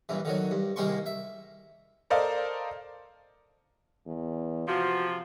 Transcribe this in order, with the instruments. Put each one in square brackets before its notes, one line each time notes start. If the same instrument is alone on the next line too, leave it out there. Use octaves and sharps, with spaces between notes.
[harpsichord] A#1 G2 E3
D3 D#3 F#3
G2
C2 D#3 G#3 A#3 C6 C#6
E5
[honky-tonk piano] A4 A#4 C5 D5 D#5 F5
[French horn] E2
[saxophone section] C3 F3 [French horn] F#4